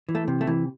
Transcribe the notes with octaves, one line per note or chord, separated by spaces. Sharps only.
E3
A3
C3
A3
E3